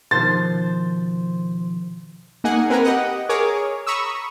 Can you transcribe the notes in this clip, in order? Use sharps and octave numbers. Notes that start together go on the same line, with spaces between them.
B2 D#3 F3 C5 A6
A#3 D#4 G#4 F#5 G#5
C4 A#4 B4 G#5 A#5
G4 D#5 F#5
G#4 A#4 C#5 D6
A#5 B5 C#6 D#6 E6